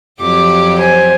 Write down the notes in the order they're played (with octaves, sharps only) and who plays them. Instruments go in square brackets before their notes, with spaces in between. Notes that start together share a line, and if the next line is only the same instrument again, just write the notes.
[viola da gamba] F2 F#3 G4 [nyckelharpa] D6
[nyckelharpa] C5 G#5